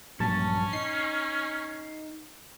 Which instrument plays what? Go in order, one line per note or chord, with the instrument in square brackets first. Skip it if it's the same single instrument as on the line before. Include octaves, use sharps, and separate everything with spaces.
[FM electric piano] A#1 A5 A6 [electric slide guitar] G2 F#3 [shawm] C#4
[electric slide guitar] D#4 [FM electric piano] C7